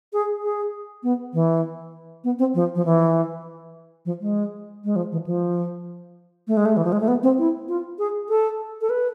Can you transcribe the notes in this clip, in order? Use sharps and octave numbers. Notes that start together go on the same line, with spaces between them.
G#4
G#4
B3
E3
B3
C4
F3
F3
E3
F3
G#3
G#3
F3
E3
F3
A3
G#3
A3
E3
F3
G#3
A3
B3
C4
E4
F4
G#4
A4
A4
B4